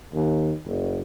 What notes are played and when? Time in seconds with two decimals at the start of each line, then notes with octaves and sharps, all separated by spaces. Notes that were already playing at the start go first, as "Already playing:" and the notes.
0.13 D#2
0.66 F#1